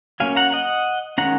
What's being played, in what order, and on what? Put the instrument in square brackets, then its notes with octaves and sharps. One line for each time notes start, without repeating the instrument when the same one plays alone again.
[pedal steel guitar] F#3 A#3 C#4 F5 G#5
F#5 A#5
D#5 F#5
D#3 G#3 C#4 F#5 A#5